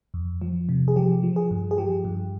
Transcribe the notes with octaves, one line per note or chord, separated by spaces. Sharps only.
F2
F3
C3
G#4
F3 G4
F3
G#4
G2
G#4
F3 G4
G2